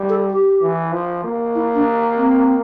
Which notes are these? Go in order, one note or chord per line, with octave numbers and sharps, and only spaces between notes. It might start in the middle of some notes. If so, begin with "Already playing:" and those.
Already playing: G3
A4
G4
E3
F3
A#3
E4
D4
C4